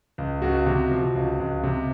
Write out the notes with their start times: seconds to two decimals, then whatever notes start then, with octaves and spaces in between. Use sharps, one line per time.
0.18 C#2
0.42 C#2 F#4
0.66 C3
0.91 F3
1.15 C#2
1.40 C#2
1.63 C3